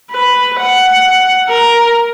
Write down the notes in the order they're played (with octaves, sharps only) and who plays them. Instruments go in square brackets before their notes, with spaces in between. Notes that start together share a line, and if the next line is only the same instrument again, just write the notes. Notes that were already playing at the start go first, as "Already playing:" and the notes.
[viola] B4
F#5
A#4